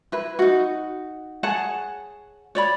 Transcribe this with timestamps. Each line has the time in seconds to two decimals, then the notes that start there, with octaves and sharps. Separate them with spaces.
0.12 E4 B4
0.39 D#4 F#4
1.43 G#4 C#5 F#5 A5
2.55 C#5 D5 B5